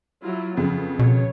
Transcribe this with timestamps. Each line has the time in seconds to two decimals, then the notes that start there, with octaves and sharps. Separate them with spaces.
0.23 F#3 E4 F4
0.57 F2 C#3 B3
0.99 B2 C#5